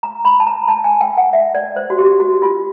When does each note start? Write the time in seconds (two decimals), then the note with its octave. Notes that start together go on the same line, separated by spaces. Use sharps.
0.03 A#5
0.25 B5
0.40 A5
0.47 A#5
0.68 A5
0.84 G#5
1.01 G5
1.17 F#5
1.33 E5
1.55 D5
1.76 C5
1.90 F#4
1.98 G4
2.20 F#4
2.42 F4